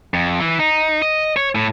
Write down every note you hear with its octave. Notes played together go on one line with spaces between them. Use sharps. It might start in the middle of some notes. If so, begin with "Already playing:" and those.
F2
E3
D#4
D#5
C#5
A2